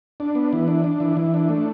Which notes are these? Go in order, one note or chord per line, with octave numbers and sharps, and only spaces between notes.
D4
B3
E3
D4
D4
E3
E3
D4
A3